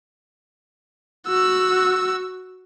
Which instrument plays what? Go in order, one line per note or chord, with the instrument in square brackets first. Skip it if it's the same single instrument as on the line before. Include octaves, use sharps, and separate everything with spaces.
[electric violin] F#4 E6